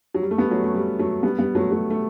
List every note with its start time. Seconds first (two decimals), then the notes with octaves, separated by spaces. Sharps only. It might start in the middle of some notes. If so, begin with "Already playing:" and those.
0.14 F#3
0.22 G3
0.31 A3
0.38 G3 B3
0.51 F#3 A3
0.63 A3 C#4
0.75 G3
0.99 F#3 A3
1.23 G3 B3
1.39 G3 B3
1.55 F#3 A3
1.71 F#3 A3
1.90 A3